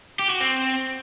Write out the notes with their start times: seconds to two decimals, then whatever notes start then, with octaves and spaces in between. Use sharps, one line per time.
0.19 G4
0.30 F#4
0.41 C4